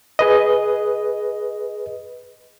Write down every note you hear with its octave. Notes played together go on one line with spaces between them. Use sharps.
G#4 B4 D#5